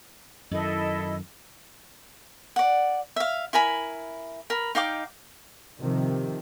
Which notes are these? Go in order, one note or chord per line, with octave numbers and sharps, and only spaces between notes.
F#2 D#3 E4 A4 D#5
D5 F#5
E5 F5
E4 A#4 G#5 B5
A#4 B5
D#4 F5 G5 D6
C3 D#3 F3